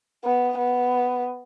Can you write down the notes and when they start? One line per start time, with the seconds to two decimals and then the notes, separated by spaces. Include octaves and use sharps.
0.25 B3
0.58 B3